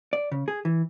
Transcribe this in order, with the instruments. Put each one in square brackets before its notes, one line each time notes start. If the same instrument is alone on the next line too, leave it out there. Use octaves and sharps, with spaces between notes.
[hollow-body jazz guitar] D5
C#3
G#4
E3